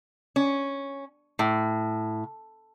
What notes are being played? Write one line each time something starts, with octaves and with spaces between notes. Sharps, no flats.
C#4
A2